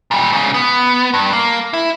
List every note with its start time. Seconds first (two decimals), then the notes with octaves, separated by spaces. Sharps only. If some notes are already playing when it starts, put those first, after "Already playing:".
0.11 A#2 G3
0.32 G#2 C#3
0.54 B3
1.14 G2
1.33 A#3
1.73 E4